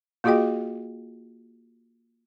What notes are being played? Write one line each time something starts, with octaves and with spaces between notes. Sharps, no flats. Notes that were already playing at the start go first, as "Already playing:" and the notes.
A#3 F4 F#4 G#4 D#5 G5